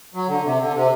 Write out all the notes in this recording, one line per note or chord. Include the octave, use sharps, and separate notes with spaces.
F#3
D3
C3
D3
C3